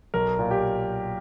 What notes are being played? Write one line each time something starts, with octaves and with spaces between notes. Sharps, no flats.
B1 A#4
A#2
G4